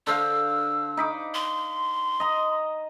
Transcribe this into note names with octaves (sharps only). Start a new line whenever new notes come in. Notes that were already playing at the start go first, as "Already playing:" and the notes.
D3 C5 F5 E6
D#4 B5 D6
C6
D#5 A#5